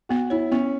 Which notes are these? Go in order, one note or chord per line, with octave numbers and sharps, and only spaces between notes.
B3 F#4
E4 C#5
B3 C#4